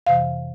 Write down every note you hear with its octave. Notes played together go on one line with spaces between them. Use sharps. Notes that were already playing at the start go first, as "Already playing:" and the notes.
F2 C3 E3 F5